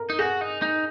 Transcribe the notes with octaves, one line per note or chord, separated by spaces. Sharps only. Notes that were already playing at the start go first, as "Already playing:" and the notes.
Already playing: A#4
D#4
F#4 G#4
D#4
D#4